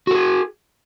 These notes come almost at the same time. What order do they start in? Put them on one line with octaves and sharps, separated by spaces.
F#4 A4 G#4